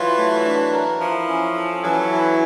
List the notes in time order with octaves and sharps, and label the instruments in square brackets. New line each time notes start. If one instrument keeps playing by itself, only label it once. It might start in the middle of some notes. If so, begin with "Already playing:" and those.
Already playing: [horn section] E3 F#3 [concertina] F4
[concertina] A3
D4
A#4
[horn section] F3 [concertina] E4
[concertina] C#4
A4
[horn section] E3 F#3 [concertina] C#4
[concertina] E4